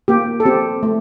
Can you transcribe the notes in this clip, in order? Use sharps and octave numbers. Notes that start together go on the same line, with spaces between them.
A#3 G4
A4
C4 G4
A3